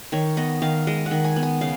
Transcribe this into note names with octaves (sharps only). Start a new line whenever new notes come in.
D#3 C#5
B3 D#5
D#3 F5
G#3 D#5
F#5
D#3
G#5
B3
G#5
C#3 F5